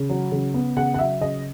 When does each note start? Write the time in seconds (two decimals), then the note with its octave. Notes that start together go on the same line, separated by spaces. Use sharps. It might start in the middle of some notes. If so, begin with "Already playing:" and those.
Already playing: C#3
0.09 F#3
0.32 C#3
0.54 B3
0.76 C#3 F#5
0.94 F#5
0.99 F#3 E5
1.21 C#3 D#5